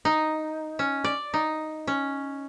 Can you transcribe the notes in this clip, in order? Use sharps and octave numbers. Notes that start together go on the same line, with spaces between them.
D#4
C#4
D5
D#4
C#4